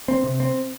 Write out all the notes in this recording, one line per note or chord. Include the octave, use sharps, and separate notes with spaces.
C4
C3
C4